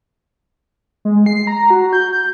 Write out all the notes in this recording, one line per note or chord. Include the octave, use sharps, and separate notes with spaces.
G#3
C7
A#5
F#4
G6
G6